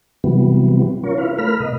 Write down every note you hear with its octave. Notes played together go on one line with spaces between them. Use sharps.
C3 E3 F#3 G3 B3
C#4 F4 A#4 C#5
E4 B4 F5
A3 A#4 B5 F6
B2 D#5